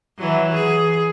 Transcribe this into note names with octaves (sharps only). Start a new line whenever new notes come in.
E3 F#3
G#4